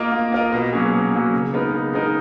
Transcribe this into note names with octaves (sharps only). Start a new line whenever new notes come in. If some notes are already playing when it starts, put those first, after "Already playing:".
Already playing: A#3 F4 A#4 D#5
A#3
F4 A#4 D#5
B2
F#3 A#3 C#4 G#4
B2
F#3 A#3 C#4 G#4
C#3
G#3 B3 D#4 A#4
C#3
G#3 B3 D#4 A#4